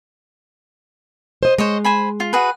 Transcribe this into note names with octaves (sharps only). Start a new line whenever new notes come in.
C5 D#5
G#3 C5 C#5 D#5
C5 G#5 B5
F4
F#4 G#4 B4